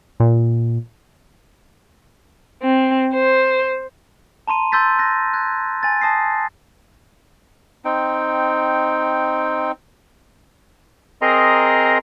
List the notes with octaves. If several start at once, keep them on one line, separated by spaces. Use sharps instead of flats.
A#2
C4
C5
A5 A#5 C6 D#7
C6 E6 G6 A6 B6
F#6 A#6
F#6 G#6
G#5 A6
A5 D#6 A#6 C7
C4 D#4 G5
C4 G#4 A#4 D#5 A#5 C6